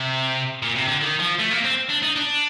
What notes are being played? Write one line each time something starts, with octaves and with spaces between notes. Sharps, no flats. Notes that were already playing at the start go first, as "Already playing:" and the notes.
Already playing: C3
A#2
C3
D3
D#3
F3
A3
A#3
C4
D4
D#4
D4